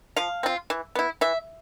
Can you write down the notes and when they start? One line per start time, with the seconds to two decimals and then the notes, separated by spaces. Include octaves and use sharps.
0.17 F3 F5
0.43 C4 F4
0.70 E3
0.95 B3 E4
1.21 E3 E5